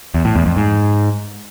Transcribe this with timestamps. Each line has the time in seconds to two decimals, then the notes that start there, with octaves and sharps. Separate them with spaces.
0.14 E2
0.25 A2
0.35 E2
0.46 F2
0.56 G#2